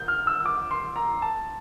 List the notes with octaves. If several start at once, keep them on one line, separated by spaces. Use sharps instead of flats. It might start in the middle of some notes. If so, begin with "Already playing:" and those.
Already playing: G6
F6
E6
D6
C6
A#5
A5